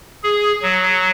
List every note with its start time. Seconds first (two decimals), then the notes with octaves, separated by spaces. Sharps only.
0.23 G#4
0.62 F#3